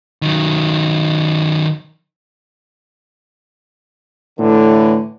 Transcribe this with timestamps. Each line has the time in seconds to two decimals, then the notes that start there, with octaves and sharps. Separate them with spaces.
0.23 D#3 F#3
4.38 A2 D3 E3